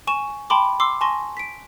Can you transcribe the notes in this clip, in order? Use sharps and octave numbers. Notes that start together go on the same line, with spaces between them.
G#5 C#6 E7
G5 A5 B5 C6 D6
C6 D6 E6 C7
G#5 A5 C6 C#6 A#6
B6 D7